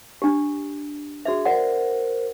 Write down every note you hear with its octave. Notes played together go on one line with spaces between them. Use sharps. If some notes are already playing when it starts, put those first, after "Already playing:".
D4 G4
D4 F#4 G#4 E5
A#4 C5 D5 F#5